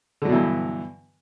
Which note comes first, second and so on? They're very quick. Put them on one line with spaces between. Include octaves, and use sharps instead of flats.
D3 F#3 B2 E3 G2